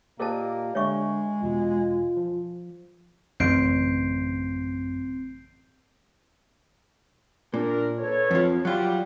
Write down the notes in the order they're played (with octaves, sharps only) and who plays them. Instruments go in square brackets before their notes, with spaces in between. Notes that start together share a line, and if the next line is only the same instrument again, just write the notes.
[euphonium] A#2 [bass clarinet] A#3 [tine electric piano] G4 D5 D#5 [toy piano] A#4 C5 A5
[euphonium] D3 [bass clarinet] G#3 [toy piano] C#5 E5 C#6
[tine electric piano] E2 B2 [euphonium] F4
[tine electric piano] F3
[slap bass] A1 C#3 [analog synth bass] F#2 [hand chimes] C4 C6 [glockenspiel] G6 C7 D7
[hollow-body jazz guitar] A#2 [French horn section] D4 A#4
[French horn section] A4 B4 C#5
[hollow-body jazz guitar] F2 F3
[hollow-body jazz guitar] F#3 F4 [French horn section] G3